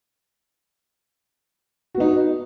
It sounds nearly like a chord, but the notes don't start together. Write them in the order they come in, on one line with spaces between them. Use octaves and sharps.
F#4 B3 D#4